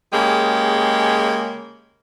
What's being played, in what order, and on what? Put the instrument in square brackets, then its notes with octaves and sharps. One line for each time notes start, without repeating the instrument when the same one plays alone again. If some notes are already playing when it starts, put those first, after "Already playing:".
[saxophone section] C#3 G#3 A#3 G4